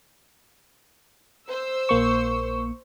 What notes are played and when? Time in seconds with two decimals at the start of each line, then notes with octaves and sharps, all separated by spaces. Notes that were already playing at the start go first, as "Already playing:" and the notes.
1.48 C5 E6
1.89 A#1 A#3 C#6